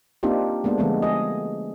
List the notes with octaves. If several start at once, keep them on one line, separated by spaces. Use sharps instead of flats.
A#3 C4 D4 D#4 F4 G4
G#3 A#3 B3 D4
D3 F3 G#3 A3 B3 C4
G#4 D#5